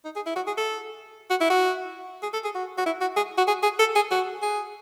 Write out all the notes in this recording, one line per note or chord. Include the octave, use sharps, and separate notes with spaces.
D#4
G#4
E4
F#4
G#4
A4
F#4
E4
F#4
G#4
A4
G#4
F#4
F#4
E4
F#4
G#4
F#4
G#4
G#4
A4
G#4
F#4
G#4